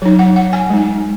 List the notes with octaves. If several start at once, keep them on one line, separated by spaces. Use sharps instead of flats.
F#3 D#4 C#5
F#5
F#5
G#5
G#3 D#4